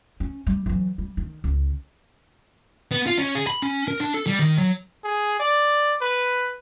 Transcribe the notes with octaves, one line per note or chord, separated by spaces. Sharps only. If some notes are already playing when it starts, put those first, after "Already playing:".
C#4
G3
E3 F#3
G3
D#3
C#2
B3
F4
C#4
G#4
B5
C#4
A#4
D4
A4
G3
D#3
F#3
G#4
D5
B4